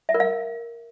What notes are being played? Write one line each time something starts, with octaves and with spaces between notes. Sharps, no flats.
E5
A#4
F5